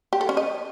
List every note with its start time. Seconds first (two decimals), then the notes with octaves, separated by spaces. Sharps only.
0.13 G4
0.21 A4
0.29 C#4
0.37 D#5